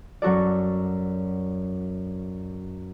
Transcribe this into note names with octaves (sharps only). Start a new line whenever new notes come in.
F#2 F#3 F#4 A4 D5